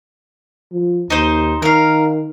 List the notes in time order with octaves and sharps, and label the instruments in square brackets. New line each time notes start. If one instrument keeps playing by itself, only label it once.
[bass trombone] F3
[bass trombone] D#2 [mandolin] D#4 C5
[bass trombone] D#3 [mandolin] A#4 F5